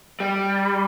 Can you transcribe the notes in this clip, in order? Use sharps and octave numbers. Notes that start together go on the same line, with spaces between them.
G3